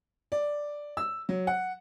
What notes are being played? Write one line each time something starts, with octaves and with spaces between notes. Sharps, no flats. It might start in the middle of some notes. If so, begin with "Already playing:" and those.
D5
E6
F#3
F#5